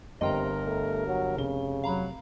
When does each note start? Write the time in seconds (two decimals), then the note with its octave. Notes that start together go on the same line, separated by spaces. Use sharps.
0.21 G1 C3 G3 A#4 D#5 G5 A#5 C6
0.66 A3
1.07 F#3
1.37 F1 C#3 G7
1.84 F#3 F5 A#5 B5